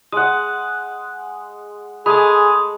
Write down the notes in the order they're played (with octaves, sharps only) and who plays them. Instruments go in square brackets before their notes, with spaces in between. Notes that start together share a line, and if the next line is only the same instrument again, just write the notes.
[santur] G#3 F#5 [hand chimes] D#6
[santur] G#3 A3 [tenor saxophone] G#4 [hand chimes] B5 D#6